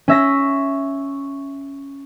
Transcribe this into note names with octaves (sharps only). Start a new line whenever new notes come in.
C#4 E5 A#6